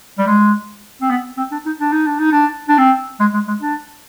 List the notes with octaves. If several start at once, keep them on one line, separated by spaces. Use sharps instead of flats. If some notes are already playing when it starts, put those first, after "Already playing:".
G3
G#3
C4
B3
C4
D4
D#4
D4
D#4
D4
D#4
D4
D4
C4
G#3
G#3
G#3
D4